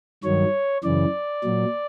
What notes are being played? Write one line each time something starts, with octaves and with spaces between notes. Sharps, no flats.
G2 D#3 F#3 C#5
F#2 C#3 E3 D5
A#2 F#3